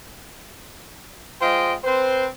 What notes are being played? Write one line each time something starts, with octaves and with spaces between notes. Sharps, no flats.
G#3 F4 C5 D#5 G5
C4 B4 C5